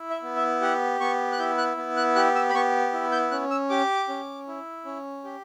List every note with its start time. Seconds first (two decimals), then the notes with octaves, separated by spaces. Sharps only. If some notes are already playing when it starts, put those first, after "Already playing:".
Already playing: E4
0.10 E5
0.23 B3
0.36 E5
0.61 G4 F#5
1.00 B3 C#6
1.32 F#6
1.38 E4 G6
1.58 F#6
1.77 B3
1.97 F#6
2.15 G4 F#6
2.35 E6
2.49 B5
2.55 B3 C#6
2.93 E4
3.12 G6
3.31 C#4 F#6
3.51 E6
3.70 G4 D6
4.08 C#4
4.48 E4
4.85 C#4
5.24 G4